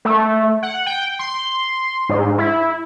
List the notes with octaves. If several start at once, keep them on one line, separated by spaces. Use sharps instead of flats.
A3
F#5
G5
C6
G#2
E4